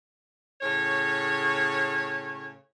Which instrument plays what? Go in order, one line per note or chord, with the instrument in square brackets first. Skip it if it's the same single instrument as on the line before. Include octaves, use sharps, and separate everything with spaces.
[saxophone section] A2 C#3 C#5